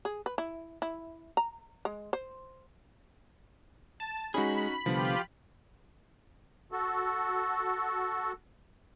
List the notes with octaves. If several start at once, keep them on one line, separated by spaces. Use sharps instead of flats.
G#4
B4
E4
E4
A#5
G#3
C5
A5
G#3 C#4 D#4 F#4 G#4 B5
C2 D3 F3 B3 F4 G4
F#4 A4